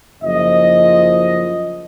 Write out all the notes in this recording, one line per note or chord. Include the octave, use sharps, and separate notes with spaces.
F#1 F3 D#5